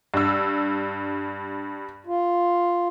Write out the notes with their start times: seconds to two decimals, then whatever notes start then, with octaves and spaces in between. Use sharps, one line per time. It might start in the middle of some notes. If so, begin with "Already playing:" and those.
0.14 G2 E6
2.07 F4